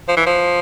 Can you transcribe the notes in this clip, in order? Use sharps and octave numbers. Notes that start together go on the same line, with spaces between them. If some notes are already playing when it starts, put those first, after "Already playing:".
F3
E3
F3